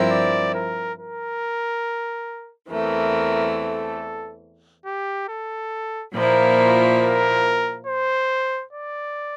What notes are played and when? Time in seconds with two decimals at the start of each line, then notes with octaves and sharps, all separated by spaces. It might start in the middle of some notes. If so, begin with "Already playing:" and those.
Already playing: G2 F3 C4 E4 A#4
0.11 D5
0.54 A#4
0.99 A#4
2.70 E2 E3 A3 C4 A#4
3.57 A4
4.86 G4
5.28 A4
6.14 A#2 F3 A#3 E4 A#4
7.01 A#4
7.87 C5
8.73 D5